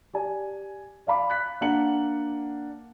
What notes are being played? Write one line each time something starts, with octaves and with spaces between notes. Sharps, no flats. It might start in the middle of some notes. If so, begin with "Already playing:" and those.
G4 D5 G#5
D5 F5 B5 D6
F#6 B6
A#3 D4 F#5 C#7 F#7